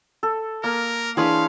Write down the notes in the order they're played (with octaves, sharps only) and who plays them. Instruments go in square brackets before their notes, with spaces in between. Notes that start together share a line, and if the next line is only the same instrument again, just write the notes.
[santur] A4
[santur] A#3 [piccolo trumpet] A#4
[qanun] E3 D4 B4 [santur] G#4 C#5 C6 [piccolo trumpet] F5